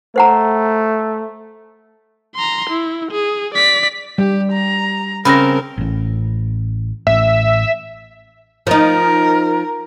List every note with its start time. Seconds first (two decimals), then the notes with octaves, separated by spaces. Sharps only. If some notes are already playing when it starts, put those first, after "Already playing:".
0.16 A3 C5 F#5 A#5
2.35 A#5 C6
2.70 E4
3.12 G#4
3.55 D5 B6
4.18 G3 G4
4.52 A#5
5.25 C#3 C4 A#4 B5 A#6
5.78 A1 A2
7.07 A1 A2 E5
8.67 F3 D#4 A#4